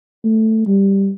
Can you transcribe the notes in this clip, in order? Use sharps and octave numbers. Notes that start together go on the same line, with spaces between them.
A3
G3